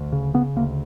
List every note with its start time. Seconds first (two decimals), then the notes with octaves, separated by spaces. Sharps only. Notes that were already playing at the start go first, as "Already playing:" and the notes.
Already playing: D2
0.12 C#3
0.34 C#3 B3
0.56 D2 A#3